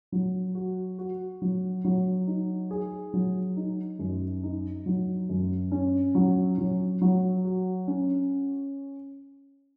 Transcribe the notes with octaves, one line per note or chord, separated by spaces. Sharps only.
F#3
F#4
F#4
F#3
F#3
D#4
G#4
F#3
D#4
F#2
D#4
F#3
F#2
C#4
F#3
F#3
F#3
F#4
C#4